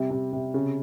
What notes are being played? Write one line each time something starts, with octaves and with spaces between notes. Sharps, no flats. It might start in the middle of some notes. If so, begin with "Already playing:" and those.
Already playing: C3 G3
C3
C3
C#3